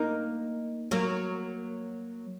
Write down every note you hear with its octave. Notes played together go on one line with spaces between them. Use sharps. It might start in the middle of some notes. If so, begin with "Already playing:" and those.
Already playing: A#3 D#4
F#3 A#3